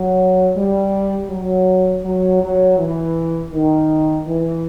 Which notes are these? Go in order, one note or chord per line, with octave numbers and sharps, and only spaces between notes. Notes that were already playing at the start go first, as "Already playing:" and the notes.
Already playing: F#3
G3
F#3
F#3
F#3
E3
D#3
E3